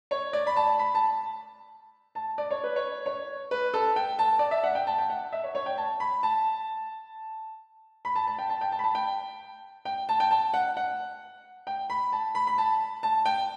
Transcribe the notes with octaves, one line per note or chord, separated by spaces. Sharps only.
C#5
D5
B5
A5
B5
A5
A5
D5
C#5
B4
C#5
C#5
B4
A4
G5
A5
D5
E5
F#5
G5
A5
G5
F#5
E5
C#5
C#5
G5
A5
B5
A5
B5
A5
A5
G5
A5
G5
A5
B5
A5
G5
G5
A5
G5
A5
F#5
F#5
G5
B5
A5
B5
B5
A5
A5
G5